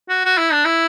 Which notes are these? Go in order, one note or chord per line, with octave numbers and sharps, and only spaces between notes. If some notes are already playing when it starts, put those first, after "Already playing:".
F#4
F#4
E4
D4
E4